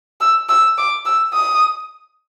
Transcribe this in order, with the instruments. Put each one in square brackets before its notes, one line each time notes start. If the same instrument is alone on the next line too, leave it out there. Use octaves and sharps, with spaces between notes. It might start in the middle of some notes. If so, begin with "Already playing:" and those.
[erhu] E6
E6
D6
E6
D#6